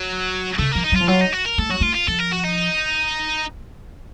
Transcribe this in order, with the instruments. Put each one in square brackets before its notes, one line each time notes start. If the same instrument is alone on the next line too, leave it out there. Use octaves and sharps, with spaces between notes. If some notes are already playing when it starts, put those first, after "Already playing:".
Already playing: [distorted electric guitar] F#3
[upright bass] C#3 [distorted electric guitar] A3
[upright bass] F3 [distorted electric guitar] A#3
[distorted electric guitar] D#4
[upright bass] F#3
[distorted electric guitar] F4
[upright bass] F3
[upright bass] F#3 [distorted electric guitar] F4
[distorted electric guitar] D#4
F#4
A#4
[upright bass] A3 [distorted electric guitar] A4
[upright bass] F#3 [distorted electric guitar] F#4
[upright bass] A3 [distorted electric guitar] F4
[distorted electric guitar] F4
[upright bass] F3 [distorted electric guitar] A4
[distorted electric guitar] A#4
F#4
D#4